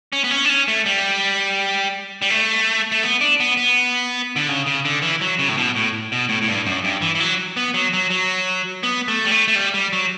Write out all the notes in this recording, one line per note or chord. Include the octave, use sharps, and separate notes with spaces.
C#4
B3
C#4
D4
C#4
A3
G3
G3
A3
A3
B3
D4
B3
B3
D3
C#3
C#3
D3
E3
F#3
C#3
A2
B2
A2
B2
A2
A2
G2
F#2
G2
E3
E3
F#3
B3
F#3
F#3
F#3
B3
A3
G3
A3
A3
G3
G3
F#3